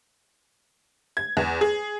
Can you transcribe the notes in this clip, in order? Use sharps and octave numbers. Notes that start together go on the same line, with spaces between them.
G#6
E2
G#4